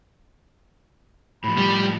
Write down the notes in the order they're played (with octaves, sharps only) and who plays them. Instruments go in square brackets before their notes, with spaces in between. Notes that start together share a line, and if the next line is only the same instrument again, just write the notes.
[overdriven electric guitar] A2 F3 [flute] B5
[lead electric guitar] G3